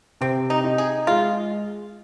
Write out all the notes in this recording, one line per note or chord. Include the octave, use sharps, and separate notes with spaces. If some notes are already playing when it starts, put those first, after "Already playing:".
C3 C4
D#4
D#4
G#4
G#3 F4